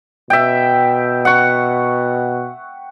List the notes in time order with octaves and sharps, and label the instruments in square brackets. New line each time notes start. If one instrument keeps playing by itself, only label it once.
[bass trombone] B2 [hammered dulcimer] E5 G5
[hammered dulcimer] F#5 C#6